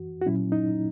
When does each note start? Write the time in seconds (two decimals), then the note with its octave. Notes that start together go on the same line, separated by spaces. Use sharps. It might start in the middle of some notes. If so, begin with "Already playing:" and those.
Already playing: F#2 E3 F#4
0.22 F#4
0.26 A#2 F#3 C#4 E4
0.52 D#4